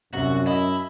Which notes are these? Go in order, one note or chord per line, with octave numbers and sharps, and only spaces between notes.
C2 F#2 C3 F#4
E4 D#5